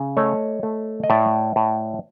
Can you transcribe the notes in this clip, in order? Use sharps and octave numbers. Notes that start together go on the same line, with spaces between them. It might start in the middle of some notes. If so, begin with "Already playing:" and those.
Already playing: C#3
A3 C#5 D#5
A3
D#5
A2 D5 E5
A2